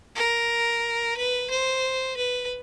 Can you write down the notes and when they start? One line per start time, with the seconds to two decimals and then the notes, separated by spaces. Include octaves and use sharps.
0.15 A#4
1.17 B4
1.50 C5
2.17 B4